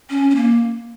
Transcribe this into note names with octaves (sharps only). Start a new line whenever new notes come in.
C#4
C#4
A#3